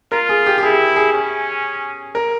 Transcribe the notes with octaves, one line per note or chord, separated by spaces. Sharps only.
F4 A#4
G#4
G4
G4
E4 G#4
G#4
C#4
A#4